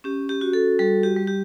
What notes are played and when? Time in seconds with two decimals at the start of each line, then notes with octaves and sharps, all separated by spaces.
0.04 C#4 G4
0.29 G4
0.41 F#4
0.53 A4
0.79 G3 A4
1.03 G4
1.16 G3
1.27 G4